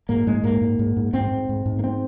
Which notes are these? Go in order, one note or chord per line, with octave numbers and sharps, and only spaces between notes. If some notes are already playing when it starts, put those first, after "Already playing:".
G#2 A#3
G#2 G#3
G#2 A#3
G#2
G#2
G#2
G#2 C4
G#2
G#2
G#2
A#3
C4